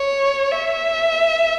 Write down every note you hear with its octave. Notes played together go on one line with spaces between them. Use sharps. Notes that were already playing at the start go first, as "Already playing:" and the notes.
Already playing: C#5
E5